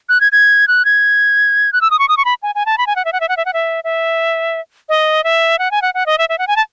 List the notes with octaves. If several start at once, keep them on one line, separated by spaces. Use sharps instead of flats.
F#6
G#6
G#6
F#6
G#6
F#6
E6
D#6
C#6
D#6
C#6
B5
G#5
G#5
A5
B5
G#5
F#5
E5
F#5
E5
F#5
E5
F#5
E5
E5
D#5
E5
F#5
G#5
F#5
F#5
D#5
E5
E5
F#5
G#5
A5